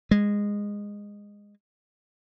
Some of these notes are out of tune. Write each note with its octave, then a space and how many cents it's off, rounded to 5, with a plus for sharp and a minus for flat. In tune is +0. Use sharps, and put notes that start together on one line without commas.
G#3 -15